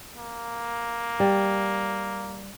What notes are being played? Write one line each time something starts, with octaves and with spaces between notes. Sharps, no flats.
A#3
G3